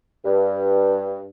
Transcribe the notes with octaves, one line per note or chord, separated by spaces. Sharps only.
G2